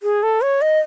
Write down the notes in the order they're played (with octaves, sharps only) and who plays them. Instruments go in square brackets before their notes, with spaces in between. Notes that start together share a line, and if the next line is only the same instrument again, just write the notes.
[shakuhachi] G#4
A4
C#5
D#5